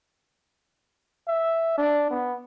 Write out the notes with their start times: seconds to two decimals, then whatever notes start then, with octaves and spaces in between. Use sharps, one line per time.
1.28 E5
1.78 D4
2.11 B3